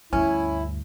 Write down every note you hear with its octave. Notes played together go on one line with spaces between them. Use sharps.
D2 G2 C#4 E4